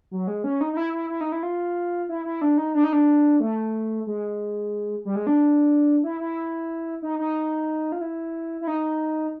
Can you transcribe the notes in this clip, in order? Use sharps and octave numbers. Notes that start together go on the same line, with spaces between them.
F#3
G#3
C#4
D#4
D#4
E4
E4
E4
D#4
E4
F4
E4
E4
D4
D#4
D4
D#4
D4
A3
G#3
G3
G#3
D4
E4
E4
D#4
D#4
F4
E4
E4
D#4